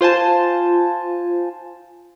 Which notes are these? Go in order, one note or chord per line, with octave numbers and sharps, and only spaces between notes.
F4 C5 G#5 A5